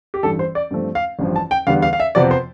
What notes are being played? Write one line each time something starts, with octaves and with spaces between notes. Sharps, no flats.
G4
A1 G2 E3 G3 A4
C5
D5
G2 F3 A3 C4
F5
A1 G2 F3
A5
G5
E2 D3 G3 B3 F5
F5
F5
E5
F2 C3 F3 B3 D5
C5